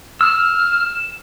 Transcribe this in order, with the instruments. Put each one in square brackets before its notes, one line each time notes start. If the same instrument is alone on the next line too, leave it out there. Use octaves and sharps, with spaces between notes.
[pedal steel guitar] E6 [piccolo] F6